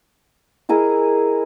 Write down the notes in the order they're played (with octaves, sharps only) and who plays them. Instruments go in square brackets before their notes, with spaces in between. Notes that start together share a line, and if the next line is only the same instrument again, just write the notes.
[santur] E4 G#4 A#4 D#5